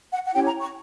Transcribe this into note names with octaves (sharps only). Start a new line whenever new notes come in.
F#5
F#5
C#4 E4 G4 C#5 G5
A#5
C#6